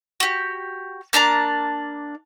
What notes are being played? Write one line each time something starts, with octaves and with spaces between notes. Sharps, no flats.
F#4 G4
A#3 D4 A5 A#5